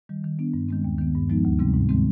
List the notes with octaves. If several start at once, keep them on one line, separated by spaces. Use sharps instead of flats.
D#3 G3
D#3
B3 D4
G2
D#3 G#3 C4
D#2
D#3 B3
G2
F3 G#3 B3 D#4
D2
C3 G3 C4
G#2
D#3 G#3 C4